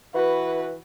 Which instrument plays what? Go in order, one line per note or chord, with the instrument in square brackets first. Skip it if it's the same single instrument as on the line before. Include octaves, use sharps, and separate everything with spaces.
[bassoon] E3 [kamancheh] F#4 B4